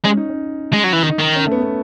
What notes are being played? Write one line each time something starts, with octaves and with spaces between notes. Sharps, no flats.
G#3 C#4
D#4
C#4
G#3
F#3
E3
D#3 D#4
D#3
C#4
A3
B3
B3